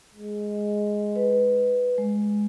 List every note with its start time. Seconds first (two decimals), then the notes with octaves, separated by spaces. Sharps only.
0.14 G#3
1.16 B4
1.98 G#3